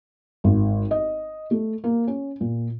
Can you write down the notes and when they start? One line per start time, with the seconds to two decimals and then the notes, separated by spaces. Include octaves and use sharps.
0.44 G#1
0.91 D#5
1.51 A3
1.84 A#3
2.07 C#4
2.41 A#2